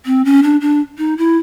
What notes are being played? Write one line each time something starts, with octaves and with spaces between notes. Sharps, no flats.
C4
C#4
D4
D4
D#4
E4